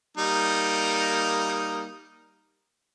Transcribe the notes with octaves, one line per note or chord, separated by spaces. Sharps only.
G3 A#3 D#4